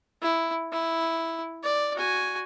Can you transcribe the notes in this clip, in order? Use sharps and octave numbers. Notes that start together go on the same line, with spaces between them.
E4
E4
D5
F#4 G#5